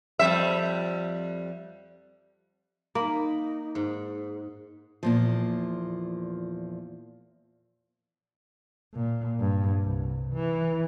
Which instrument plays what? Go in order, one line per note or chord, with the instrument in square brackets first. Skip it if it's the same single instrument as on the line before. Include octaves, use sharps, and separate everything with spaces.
[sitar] F2 G3 E5
[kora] A#3 [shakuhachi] D#4 [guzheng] B5
[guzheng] G#2
[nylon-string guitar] E2 A#2 F3
[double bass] A#2
G2
C2
E3